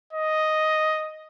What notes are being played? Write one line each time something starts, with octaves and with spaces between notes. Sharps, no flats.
D#5